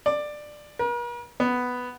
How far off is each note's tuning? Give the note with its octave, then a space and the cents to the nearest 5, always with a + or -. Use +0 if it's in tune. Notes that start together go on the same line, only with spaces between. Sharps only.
D5 +15
A#4 +45
B3 +5